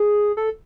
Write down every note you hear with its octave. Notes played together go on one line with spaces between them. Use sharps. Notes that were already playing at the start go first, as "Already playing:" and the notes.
Already playing: G#4
A4